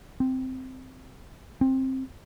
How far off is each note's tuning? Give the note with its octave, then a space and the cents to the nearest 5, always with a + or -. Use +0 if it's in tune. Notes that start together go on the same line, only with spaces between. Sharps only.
C4 -10
C4 +15